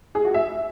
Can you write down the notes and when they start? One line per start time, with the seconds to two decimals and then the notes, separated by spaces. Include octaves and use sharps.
0.15 G#4
0.25 F#4
0.34 E5